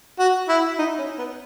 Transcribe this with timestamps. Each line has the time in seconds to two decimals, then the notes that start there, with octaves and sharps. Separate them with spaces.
0.19 F#4
0.48 E4
0.79 D#4
0.98 C#4
1.18 B3